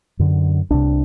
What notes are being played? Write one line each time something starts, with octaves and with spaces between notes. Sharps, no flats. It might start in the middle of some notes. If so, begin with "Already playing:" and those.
F#2 D3
C2 C3 D4